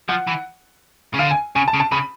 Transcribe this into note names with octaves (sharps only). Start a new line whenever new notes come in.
F3 F#5
E3
C#3
D3 F5
G#5
C#3 G#5
A5
C#3
A5
C#3 B5